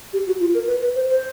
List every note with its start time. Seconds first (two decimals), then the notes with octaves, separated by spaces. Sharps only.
0.13 G4
0.27 F#4
0.40 F4
0.54 A#4
0.67 B4
0.81 B4
0.95 C5
1.08 C5